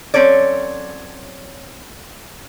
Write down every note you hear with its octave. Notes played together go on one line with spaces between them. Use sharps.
F#3 C4 C#4 A4 C#5 D5